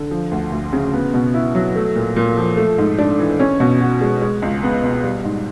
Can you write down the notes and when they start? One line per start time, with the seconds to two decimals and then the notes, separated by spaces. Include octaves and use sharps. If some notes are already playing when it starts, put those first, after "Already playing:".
Already playing: D3
0.11 F3
0.31 D2
0.52 D2
0.73 C#3
0.94 B3
1.14 B2
1.34 E4
1.55 F#3
1.76 A3
1.95 A#2
2.16 A#2
2.37 F3
2.57 A3
2.78 G#2
2.98 D4
3.19 E3
3.40 C#4
3.60 B2
3.81 F#4
4.01 G#3
4.22 G#3
4.42 C#2
4.63 B3
4.83 B2
5.03 G3
5.24 G#2